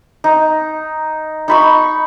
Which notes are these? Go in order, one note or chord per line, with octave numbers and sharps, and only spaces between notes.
D#4
D#4 B5 C#6